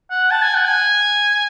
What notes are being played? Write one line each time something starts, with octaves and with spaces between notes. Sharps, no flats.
F#5
A5
G#5
F#5
G#5